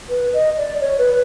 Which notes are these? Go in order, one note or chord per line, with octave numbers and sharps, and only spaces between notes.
B4
D#5
D5
C#5
B4